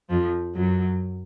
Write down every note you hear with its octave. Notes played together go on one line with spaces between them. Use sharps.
F2 F3
F#2 F#3